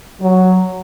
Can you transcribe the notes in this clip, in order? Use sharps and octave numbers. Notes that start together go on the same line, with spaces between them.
F#3